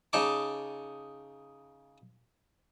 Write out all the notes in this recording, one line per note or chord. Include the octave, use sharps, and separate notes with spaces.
C#3 D#4 A5 D6